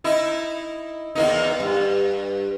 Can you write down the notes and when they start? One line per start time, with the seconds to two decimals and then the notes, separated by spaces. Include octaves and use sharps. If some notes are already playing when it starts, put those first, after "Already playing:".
0.04 D#4 E4
1.15 E2 A#3 D#4
1.60 G2